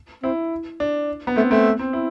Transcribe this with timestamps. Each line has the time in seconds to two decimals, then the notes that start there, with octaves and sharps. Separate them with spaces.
0.23 C4 E4
0.80 D4
1.27 B3
1.36 A3 C4
1.51 A3 C4
1.79 C4
1.93 E4